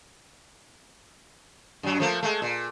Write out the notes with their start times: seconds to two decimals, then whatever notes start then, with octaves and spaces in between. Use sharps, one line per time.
1.83 F#2 F#3
2.00 F3 A3 A#3
2.23 G#3 A3
2.42 A#2